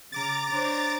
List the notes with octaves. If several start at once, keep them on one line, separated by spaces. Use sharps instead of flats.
C#3 A#5 D6 A6
D4 C5 C#5